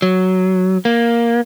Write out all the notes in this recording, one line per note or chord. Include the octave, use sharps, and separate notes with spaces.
F#3
A#3